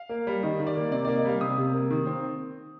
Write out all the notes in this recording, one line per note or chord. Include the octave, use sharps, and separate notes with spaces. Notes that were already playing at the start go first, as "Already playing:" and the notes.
Already playing: F5
A#3
G3
D#3 D#5
D#3
D5
A#3
C3 D5
A#3 D5
D#5
G3 F5
C3 D#6
C3
A#3
D#3
C4